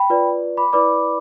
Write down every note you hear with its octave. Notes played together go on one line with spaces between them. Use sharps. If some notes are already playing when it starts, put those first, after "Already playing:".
Already playing: G5 B5
F4 B4 D5
B5 D6
E4 B4 D5 B5 D6